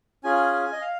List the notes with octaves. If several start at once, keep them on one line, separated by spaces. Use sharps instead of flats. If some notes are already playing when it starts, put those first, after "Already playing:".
C#4 F4 G#4 G#5
G#5
D#5
F5